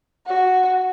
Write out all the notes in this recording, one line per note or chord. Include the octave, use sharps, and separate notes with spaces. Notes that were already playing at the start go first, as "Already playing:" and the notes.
F#4